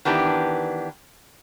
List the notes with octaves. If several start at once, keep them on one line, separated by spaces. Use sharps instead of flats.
D#3 E3 B3 D4 G4